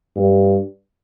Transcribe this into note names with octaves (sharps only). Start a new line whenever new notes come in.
G2